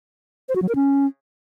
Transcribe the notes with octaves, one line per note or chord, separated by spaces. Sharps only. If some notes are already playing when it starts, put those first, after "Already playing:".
C5
F#4
F#3
A#4
C#4